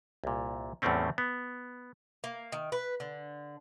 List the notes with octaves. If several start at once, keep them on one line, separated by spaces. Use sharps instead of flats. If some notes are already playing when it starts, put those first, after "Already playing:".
C2 A#2
E2 A2 G3 A3 C4 C#4
B3
A#3
D#3
B4
D3